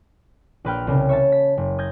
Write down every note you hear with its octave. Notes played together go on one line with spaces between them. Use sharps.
A#1 B4 G5 F6
C2 C#3
C#5 E5 A5
B6
F#1
D#6 G6 G#6 A#6